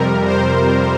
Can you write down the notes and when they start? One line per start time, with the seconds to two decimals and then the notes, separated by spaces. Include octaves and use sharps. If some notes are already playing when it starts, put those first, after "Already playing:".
Already playing: F2 C3 G3 A#4
0.26 C5